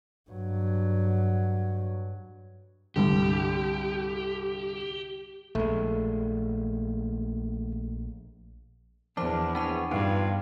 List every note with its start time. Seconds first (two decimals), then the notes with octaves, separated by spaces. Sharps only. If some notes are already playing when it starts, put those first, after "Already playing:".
0.30 G2 F#3
2.96 C2 G2 D3 G4
5.55 A#1 G#3 A3
9.17 E2 F3 D4 C5 D6
9.55 B3 D4 G#4 C#5 A5 D6
9.91 G2 B3 D#4 F4 B4